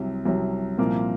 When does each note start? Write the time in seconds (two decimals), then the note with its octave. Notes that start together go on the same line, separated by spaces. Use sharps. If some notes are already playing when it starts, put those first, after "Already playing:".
Already playing: C2 C3 F#3
0.26 C2 C3 F#3
0.78 C2 A#2 F3 A#3